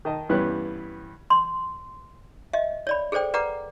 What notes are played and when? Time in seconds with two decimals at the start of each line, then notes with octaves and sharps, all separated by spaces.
0.05 D#3 D#5 A5
0.29 G2 E3 B3 C#4 G4 F#6
1.30 C6
2.53 D#5 E5
2.87 C#5 D5 B5
3.12 G#4 A4 C5 D5 G5
3.34 B4 D5 F#5 A#5 D6